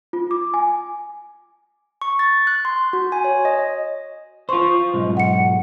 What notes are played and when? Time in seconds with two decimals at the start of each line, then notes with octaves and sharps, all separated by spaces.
0.13 F4
0.31 D6
0.54 G#5
2.02 C#6
2.19 A6
2.47 F#6
2.65 C6
2.93 F#4
3.12 G#5
3.24 C#5
3.45 D#5
4.49 F4 C5 C6 C#6
4.94 B1 G#2
5.17 F#5 C#7